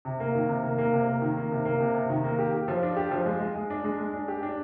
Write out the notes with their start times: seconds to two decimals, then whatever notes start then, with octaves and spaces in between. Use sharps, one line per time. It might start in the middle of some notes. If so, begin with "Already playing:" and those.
0.05 C3
0.20 A#3
0.35 D#3
0.49 C3
0.64 A#3
0.78 A#3
0.93 C3
1.07 A#3
1.22 D#3
1.37 A#3
1.52 C3
1.65 A#3
1.80 C3
1.95 C3
2.10 D#3
2.24 A#3
2.39 G4
2.53 G4
2.68 F3
2.83 D4
2.97 G4
3.11 F3
3.26 G#3
3.40 G#3
3.55 G#3
3.70 D4
3.84 G#3
3.99 G#3
4.14 D4
4.28 G4
4.43 D4